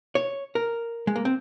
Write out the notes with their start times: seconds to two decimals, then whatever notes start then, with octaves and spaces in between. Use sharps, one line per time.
0.15 C#5
0.55 A#4
1.07 G#3
1.16 A#3
1.25 C4